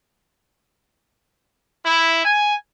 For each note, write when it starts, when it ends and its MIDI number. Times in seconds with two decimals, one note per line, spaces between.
1.85 2.23 64
2.25 2.55 80